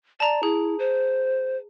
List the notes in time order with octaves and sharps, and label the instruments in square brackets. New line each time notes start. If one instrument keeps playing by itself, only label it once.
[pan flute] D5 [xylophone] A5 A#5
[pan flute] E4 [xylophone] G#4
[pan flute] C5